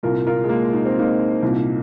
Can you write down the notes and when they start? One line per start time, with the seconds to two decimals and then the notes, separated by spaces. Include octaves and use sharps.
0.03 C2 A#2 F4 A#4
0.27 F4 A#4
0.43 G#3
0.49 A#3
0.73 D#4
0.85 C4
0.99 A#3 D#4
1.42 C2 A#2